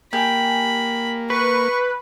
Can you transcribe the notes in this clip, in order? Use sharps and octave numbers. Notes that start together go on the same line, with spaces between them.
A#3 G4 G#5 B5
B4 C#6